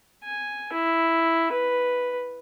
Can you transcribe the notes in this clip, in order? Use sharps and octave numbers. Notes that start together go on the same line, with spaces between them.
G#5
E4
B4